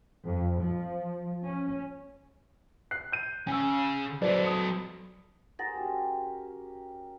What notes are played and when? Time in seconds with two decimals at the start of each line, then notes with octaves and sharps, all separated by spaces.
0.25 F2
0.59 F3
1.44 C#4
2.91 F#6 C7
3.12 G6 D#7
3.47 C#3 G#5 E6
4.22 F#3 A4 B4 C5 D5
4.44 D#6 C#7
5.59 G#4 A#4 C5 F#5 A6 A#6
5.75 C#4 F#4 G4